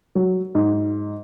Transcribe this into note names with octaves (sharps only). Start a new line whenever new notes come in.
F#3
G#2